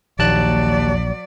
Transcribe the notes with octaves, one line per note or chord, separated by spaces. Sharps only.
A#1 D#2 F#3 D5 A5 F#6